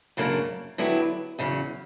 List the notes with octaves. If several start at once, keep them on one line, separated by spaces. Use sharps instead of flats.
F#2 C#3 F#3 A#3 D4
D3 F#3 B3 E4 G4
E2 C#3 F#3